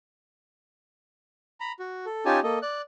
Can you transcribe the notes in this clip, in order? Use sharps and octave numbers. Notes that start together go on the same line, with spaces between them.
A#5 B5
F#4
A4
C#4 D#4 F4 G4 G#5 A5
A#3 A4 D#5
D5 F#6